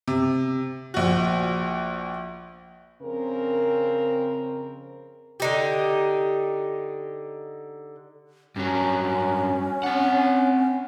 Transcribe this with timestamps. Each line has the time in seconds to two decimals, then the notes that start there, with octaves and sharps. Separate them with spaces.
0.08 C3
0.94 A#1 F#4
3.02 F2 C#3 C4 A#4
5.40 D3 D#4 G4
8.56 G2 F#3 C#4
9.83 C4 F#5